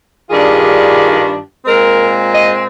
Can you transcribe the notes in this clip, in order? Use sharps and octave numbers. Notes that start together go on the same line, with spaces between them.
G2 D#3 G3 D4 F4 G#4
A#2 G#3 C4 A#4
D#5